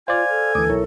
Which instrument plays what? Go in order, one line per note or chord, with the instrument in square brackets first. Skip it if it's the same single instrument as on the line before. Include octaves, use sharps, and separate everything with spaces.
[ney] F4 [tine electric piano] C5 D5 [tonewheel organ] F5 [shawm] G#5
[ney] A4
[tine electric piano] D2 E3 [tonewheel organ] A3 D6 D#6
[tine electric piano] B1 [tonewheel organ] E4 A#4 C#5